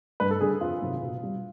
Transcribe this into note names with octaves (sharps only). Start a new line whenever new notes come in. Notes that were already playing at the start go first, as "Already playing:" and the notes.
G2 B4
A4
D3 G3 G#4
F2 F4
C3 D#3 F#3
B2
G3